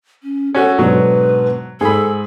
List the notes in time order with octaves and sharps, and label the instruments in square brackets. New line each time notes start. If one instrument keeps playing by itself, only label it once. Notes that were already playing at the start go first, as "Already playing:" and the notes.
[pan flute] C#4
[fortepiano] C#4 F#4 [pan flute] A4
[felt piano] G#2 B2 D3 [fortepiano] F#3 [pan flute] B4
[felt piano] G#2 [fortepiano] G#4 B5 [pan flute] A4